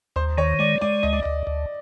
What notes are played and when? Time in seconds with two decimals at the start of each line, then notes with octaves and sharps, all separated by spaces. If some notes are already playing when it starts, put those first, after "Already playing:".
0.16 D#2 C5
0.38 D#3 C#5
0.59 G#3 D5
0.81 G#3 D5
1.03 D2 D#5
1.13 D5
1.23 D2 D#5
1.47 D2